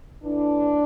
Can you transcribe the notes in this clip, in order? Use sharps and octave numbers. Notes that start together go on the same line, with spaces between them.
A2 E3 D4